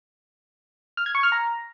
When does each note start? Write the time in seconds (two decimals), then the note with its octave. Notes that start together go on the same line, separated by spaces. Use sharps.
0.97 F6
1.06 G#6
1.15 C#6
1.23 F6
1.32 A#5